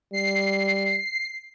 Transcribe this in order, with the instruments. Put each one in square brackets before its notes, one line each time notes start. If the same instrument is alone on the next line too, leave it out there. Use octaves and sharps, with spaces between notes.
[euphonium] G3 [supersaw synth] C7